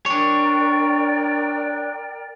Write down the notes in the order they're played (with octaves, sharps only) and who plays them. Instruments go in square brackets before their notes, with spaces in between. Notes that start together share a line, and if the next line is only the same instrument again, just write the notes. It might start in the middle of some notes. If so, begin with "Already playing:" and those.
[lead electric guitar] D4 C#5 [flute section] A#4 D5 G5